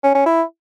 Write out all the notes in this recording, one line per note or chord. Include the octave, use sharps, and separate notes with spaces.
C#4
C#4
E4